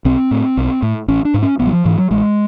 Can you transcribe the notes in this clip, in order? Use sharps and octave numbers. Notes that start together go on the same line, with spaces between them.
B1 C4
A2
B1
A2
A1 C#4
D4
G#2
C#4
A1 B3
F#3
F3
G#2 E3
F#3
A1 G#3